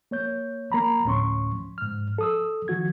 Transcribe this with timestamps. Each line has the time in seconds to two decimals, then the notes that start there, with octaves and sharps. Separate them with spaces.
0.11 A#3 C#5 G6
0.72 A#3 A#5 B5
1.05 D2 A2 C#4 C6 C#6
1.78 G#2 F6
2.18 A4 D#6 E6
2.68 D#3 F3 F#4 G#6